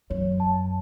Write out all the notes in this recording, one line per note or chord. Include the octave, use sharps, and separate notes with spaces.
F#2 C#5
A5